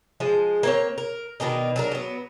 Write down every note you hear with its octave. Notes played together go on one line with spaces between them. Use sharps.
F3 G#3 C5
A#3 C4 C#5
A#4
B2 D#3 D4 D#4
F#3 D4 A#4
F#3 B3